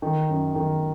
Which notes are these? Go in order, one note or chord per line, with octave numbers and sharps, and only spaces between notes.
D#3
F#2
D#3